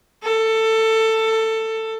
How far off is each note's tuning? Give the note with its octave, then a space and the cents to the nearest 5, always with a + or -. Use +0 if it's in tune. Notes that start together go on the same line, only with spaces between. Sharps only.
A4 +15